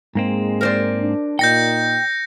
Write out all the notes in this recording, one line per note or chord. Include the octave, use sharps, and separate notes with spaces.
G#2 G#3 A#3 C4
A#4 C5 D5
D4
A#2 D#4 G5 G6 A#6 C#7